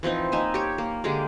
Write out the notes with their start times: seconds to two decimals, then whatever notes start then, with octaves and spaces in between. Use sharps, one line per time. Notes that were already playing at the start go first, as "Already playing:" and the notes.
0.03 E3 F3 C4 D#4
0.32 A#3 D#4 E5 G#5
0.54 G4 C#5
0.78 A#3
1.04 D3 G#3 A#3 G4